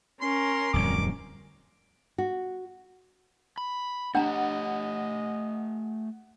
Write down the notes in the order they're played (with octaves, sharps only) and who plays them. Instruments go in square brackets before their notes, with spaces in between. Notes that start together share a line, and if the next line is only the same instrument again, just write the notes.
[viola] C#4 A#4 [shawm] C6
[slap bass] D1 F2 G3 [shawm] D6
[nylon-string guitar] F#4
[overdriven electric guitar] B5
[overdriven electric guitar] A3 G4 [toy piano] D4 A#5 [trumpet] D#5 [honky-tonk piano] F#5